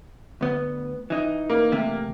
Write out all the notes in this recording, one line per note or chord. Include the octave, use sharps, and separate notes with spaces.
D2 B3
E3 D#4
A#3
E2 C3 A3